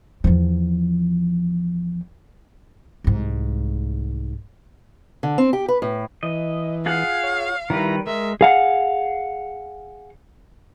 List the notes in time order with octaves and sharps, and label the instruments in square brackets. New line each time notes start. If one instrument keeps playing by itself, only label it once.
[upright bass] E2 F3
C2 G#2
[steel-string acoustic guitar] D3
C4
G4
B4
A2
[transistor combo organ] E3 [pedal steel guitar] D#5
[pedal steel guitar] F4 G#4 F#5 [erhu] F5
[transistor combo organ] C#5
[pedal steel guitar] D#3 G3 B4 [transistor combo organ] E4 A#5
[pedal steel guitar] G#3 [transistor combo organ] A#4 [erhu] E5
[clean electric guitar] G#4 F5 F#5